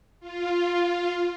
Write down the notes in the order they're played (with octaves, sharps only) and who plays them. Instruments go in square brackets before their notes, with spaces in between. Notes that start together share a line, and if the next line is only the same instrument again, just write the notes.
[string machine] F4